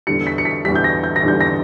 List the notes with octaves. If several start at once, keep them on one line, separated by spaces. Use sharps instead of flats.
E2 D3 G3 C#7
B6
C#7
B6
E2 D3 G3 B6
G6
A#6
G6
A#6
E2 D3 G3 G6
A#6